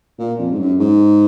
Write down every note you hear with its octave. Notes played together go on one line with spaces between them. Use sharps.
A#2
F2
G#2
F#2
G#2